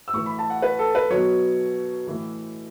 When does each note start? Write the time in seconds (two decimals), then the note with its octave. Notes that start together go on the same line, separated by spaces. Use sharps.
0.08 E6
0.13 A2 E3 C#6
0.26 B5
0.39 A5
0.50 F#5
0.62 B4
0.79 A4
0.95 B4
1.10 B2 F#3 C#5
2.07 A2 E3